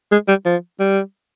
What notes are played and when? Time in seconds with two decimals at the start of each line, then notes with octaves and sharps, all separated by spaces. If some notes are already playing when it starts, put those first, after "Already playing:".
0.12 G#3
0.28 G3
0.46 F3
0.80 G3